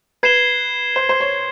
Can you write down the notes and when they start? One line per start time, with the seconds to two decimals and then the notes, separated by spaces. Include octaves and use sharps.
0.23 B4 G#6 C7 E7 G7
0.96 C5
1.09 C5
1.20 C#5